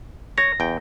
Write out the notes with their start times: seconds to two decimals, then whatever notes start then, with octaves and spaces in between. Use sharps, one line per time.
0.38 C#5 A#6
0.60 E2 G5